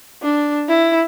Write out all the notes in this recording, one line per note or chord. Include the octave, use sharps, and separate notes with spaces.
D4
E4